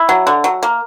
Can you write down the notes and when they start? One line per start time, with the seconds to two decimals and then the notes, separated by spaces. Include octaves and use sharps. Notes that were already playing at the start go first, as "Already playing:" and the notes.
Already playing: E4
0.09 F#3
0.27 D3
0.44 F#3
0.63 A#3